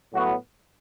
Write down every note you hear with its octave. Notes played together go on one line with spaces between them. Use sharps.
A2 F#3 B3 F#4